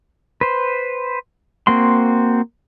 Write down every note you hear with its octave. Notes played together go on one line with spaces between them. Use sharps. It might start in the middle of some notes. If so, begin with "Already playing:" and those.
B4 C5
A#3 C4 F#4 C6